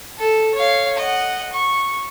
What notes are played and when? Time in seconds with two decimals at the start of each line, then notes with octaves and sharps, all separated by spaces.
0.19 A4
0.55 C#5 F5
0.97 D#5 F#5
1.53 C#6